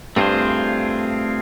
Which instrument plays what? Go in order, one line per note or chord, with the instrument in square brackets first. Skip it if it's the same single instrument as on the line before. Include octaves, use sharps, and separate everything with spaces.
[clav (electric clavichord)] G2 [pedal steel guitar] A3 C4 F4 G#4 C5